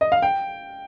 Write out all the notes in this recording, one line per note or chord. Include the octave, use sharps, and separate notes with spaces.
D#5
F5
G5